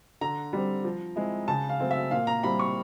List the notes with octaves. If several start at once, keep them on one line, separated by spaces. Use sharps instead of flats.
D3 A#5
G3 C4
F3
G#3 C4 E4
C#3 A5
F5
F#3 A3 C4
E5
A#2 F5
A#5
G3 C4 E4 B5
C#6